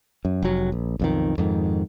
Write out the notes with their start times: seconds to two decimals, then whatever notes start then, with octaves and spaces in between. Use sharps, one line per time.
0.25 F#2
0.42 F1 F#3
0.72 A#1
0.99 B1 F2 D#3
1.38 F2 G#2 D#3